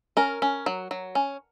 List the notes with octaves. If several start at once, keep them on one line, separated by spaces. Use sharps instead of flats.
C#4 A#4
C#4
F#3
F#3
C#4